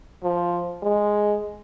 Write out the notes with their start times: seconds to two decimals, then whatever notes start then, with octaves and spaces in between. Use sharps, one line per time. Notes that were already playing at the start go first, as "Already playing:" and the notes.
0.23 F3
0.83 G#3